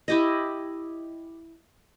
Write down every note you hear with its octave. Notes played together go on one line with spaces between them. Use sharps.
E4 G4 D#5